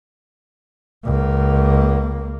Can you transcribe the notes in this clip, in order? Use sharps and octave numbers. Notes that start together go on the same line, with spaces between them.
C#2 A#3